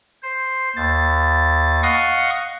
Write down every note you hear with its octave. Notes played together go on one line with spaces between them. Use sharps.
C5
D#2 A6
D#5 F5 F#5 C#6 D#6